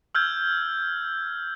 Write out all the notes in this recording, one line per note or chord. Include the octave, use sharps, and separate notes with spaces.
E6 F6 G6 G#6